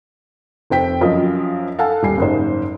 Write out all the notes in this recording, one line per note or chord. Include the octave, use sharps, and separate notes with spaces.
F1 C4 G5 B6
F#2 F3 D#5
A4 F5 F#5 G#5 A5
D#1 G3 G#5 C7
F#1 G#2 C5